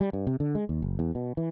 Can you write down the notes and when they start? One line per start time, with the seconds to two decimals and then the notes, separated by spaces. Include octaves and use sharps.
0.01 G3
0.13 G2
0.27 C3
0.40 D3
0.55 G#3
0.69 D#2
0.82 F#1
0.99 E2
1.15 B2
1.37 E3